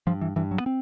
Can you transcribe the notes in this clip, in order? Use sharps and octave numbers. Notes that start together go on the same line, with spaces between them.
G2 F3
E3
G2 E3
F#3
B3
C4